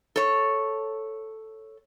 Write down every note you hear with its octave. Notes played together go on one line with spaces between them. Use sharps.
A4 C#5